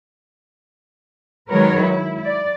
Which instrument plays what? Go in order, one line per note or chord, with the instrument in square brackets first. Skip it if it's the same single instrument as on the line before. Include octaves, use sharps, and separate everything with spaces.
[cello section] D#3 F#3 G#3 A#4 B4 C#5
E4
D5